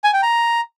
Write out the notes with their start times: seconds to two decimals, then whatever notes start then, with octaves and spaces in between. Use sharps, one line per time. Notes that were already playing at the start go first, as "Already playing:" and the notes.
0.04 G#5
0.13 G5
0.23 A#5